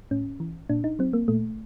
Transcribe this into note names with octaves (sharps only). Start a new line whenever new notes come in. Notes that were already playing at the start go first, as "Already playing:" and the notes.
A2 C#4
E3
A#2 D4
D#4
F#3 C4
A#3
A#2 A3